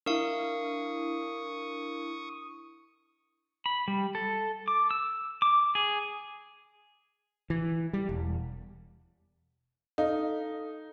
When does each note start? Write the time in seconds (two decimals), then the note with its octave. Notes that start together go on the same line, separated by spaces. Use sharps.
0.06 D4 E4 A#4 F5 C#6 D#6
3.66 B5
3.88 G3
4.15 A4
4.68 D6
4.91 E6
5.42 D6
5.75 G#4
7.50 E3
7.93 G3
8.09 E1
9.98 D#4 A4 F5